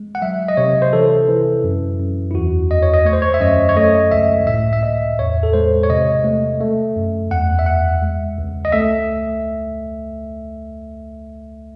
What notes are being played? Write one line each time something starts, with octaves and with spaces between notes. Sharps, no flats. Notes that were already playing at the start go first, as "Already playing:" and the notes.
Already playing: G#3
F#5
F#3 E5
D#5
C3 C#5
C5
E3 A4
E3
F#2
F#2
E4
E2 F#4
E2 D#5
C#5
D#5
A3 C#5
C5
C#5
E5
F#2 D#5
C#5
A3 D#5
C#2 E5
A2 E5
E5
A2 D#5
E2 C#5
A4
G#3 C5
C#5
C3 D#5
A3
A3
F#2
E2 F#5
E5
E2 F#5
G#3
C#2
D#5
A3 E5